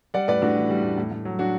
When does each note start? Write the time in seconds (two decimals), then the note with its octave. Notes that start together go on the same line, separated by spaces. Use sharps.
0.14 G3 D5 F#5
0.28 A2 B4 D5
0.42 A2 D4 F#4
0.56 E3
0.70 G3
0.83 A2
0.98 A2
1.12 A2
1.25 F#3
1.39 F#3 D4 F#4